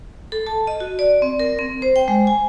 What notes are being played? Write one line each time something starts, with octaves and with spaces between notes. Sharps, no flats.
A4
A5
D#5
F#4
D5
C4
A#4
C4
C5
G5
G#3
G#5